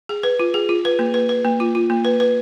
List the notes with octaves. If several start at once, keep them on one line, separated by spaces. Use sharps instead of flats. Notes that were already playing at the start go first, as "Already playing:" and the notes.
G#4
B4
F4
G#4
F4
B4
A#3
B4
B4
A#3
F4
F4
A#3
B4
B4